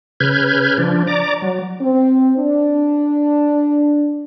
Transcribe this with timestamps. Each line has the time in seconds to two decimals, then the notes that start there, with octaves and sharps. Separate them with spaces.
0.20 C#3 B4 F6 G6 G#6
0.78 F3 D4
1.07 D5 A#5 D6
1.42 F#3
1.81 C4
2.38 D4